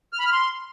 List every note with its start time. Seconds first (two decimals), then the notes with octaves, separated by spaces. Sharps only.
0.13 F6
0.19 B5
0.26 F6
0.32 C6